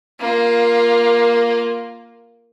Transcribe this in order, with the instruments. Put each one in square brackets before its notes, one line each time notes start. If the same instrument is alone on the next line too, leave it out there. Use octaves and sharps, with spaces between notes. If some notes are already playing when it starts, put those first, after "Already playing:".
[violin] A#3 F4